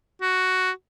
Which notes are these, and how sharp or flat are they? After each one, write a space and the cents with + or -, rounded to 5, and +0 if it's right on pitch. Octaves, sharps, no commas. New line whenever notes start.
F#4 +5